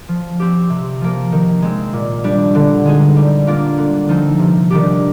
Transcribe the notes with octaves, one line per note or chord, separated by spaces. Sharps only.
F3
C4 G4
C3
F3 A#3
D#3
G#3 C4
A#2
G3 D4
D3
G#3 D#4 G#4
G3
A#3 D4 F4
D3
F3 C4 D#4
C3
D#3 G3 D4 G4